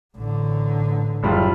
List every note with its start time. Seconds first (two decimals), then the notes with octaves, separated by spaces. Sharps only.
0.16 A1 D3
1.23 F#1 G3 F4